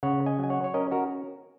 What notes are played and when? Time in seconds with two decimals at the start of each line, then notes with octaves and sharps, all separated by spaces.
0.03 C#3 C#5 F#5
0.26 D#5 G#5
0.39 F#3 G#5
0.50 C#5 F#5
0.64 C#5
0.74 C#4 A#4 D#5
0.91 F#4 A#4